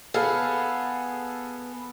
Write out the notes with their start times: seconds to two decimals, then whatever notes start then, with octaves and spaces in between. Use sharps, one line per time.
0.14 B3 G#4 A4 F5